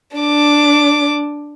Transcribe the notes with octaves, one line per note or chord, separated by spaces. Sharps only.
D4 D6